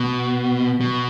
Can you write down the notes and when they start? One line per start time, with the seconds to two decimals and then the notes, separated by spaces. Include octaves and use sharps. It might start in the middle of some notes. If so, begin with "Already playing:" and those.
Already playing: B2
0.81 B2